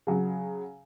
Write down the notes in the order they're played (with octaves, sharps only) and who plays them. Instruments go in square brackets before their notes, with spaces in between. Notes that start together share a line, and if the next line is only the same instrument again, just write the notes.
[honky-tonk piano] C#3 F#3